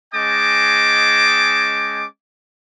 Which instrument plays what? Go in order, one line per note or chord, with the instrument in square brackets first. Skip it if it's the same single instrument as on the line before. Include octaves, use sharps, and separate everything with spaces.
[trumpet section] G#3 C#4 D#5 G5 A5 D6